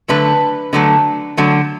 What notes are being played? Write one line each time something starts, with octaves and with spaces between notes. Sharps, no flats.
D3 F#3 A3 B4
D3 F#3 A3
D3 F#3 A3